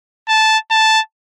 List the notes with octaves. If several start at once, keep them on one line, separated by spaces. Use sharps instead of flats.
A5
A5